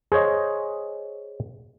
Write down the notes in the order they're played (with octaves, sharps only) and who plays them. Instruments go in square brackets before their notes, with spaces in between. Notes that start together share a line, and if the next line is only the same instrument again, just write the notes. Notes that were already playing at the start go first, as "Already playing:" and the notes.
[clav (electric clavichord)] G#4 C5 C#5 D#5